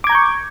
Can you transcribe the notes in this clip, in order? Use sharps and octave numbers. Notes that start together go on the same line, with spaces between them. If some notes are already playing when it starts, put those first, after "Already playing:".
A#5 C#6 D6 G6 G#6